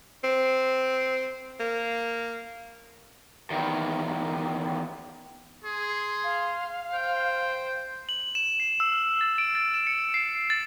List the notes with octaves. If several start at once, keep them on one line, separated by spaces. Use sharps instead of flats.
C4
A#3
E2 D#3
G#4 C6
F5
C5 G5
F#7
E7
C7
E6
F6
A6
D7
A6
E7
C#7
C7
A6